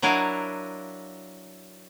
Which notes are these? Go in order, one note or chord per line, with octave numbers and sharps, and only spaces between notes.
F#3 D4 E4 A#4 D#5 F5